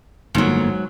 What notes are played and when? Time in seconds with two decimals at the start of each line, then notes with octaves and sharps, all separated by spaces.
0.35 G1 F2 G#2 F#3 A#3